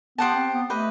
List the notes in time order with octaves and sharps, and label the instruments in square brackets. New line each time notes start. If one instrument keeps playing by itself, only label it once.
[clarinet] B3 [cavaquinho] G4 C5 F#5 A5
[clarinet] C4
B3
[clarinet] A3 [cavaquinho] G4 B4 D#5